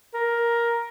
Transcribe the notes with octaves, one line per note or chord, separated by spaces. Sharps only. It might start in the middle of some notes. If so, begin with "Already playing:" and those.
A#4